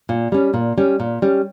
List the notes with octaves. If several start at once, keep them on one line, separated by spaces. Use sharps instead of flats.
A#2
G3 C#4
A#2
G3 C#4
A#2
G3 C#4